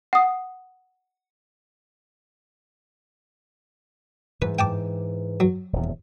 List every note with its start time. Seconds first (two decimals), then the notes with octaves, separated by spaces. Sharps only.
0.13 F#5 D#6
4.42 G#2 E3 B4
4.59 G5 A5 D6
5.40 F#3
5.73 D#1 E2